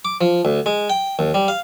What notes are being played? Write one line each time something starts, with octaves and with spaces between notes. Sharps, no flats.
D6
F3
D2
G#3
G5
D#2
G3
F5